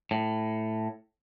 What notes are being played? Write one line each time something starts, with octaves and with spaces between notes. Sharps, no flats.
A2